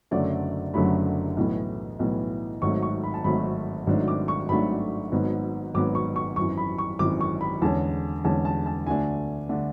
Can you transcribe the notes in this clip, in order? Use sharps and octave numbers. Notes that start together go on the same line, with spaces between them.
F#1 F#2 D3 F#3 A3 D5
F#1 F#2 D3 F#3 A3 B5
B1 A2 E3 B3
B1 A2 E3 B3
G#1 G#2 F#3 A3 C#6
C#6
B5
A5
G#1 G#2 F#3 A3 B5
G#1 G#2 F#3 A3 D4
D6
C#6
G#1 G#2 F#3 A3 D4 B5
G#1 G#2 F#3 B3
G#1 G#2 F#3 B3 D6
C#6
C#6
G#1 F#2 E3 C#6
B5
C#6
G#1 F#2 E3 D6
C#6
B5
E2 D3 G#3 C#4 A5
E2 D3 G#3 C#4 A5
A5
A5
D2 D3 A3 D4 G#5
D3 A3 D4